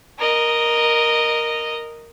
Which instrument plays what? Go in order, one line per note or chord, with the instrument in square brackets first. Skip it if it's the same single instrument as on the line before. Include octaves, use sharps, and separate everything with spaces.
[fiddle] A#4 D#5